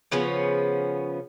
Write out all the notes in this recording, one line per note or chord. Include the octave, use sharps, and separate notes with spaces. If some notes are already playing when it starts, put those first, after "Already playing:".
C#3 F3 B3 C#4